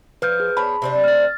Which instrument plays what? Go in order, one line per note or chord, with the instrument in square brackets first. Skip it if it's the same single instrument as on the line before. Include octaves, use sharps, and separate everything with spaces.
[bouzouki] F3 [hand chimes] B4 F6 G6
[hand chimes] G#4
[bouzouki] B3 C5 C#5 [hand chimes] A5 B5
[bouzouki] C3 C4 D4
[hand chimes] F6 A6